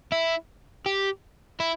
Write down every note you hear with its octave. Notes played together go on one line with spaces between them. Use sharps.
E4
G4
E4